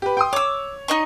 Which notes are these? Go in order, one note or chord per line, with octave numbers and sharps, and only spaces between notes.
G4 B4
G5 C6 D#6
C#5 D6 E6
D#4 D#5 C#6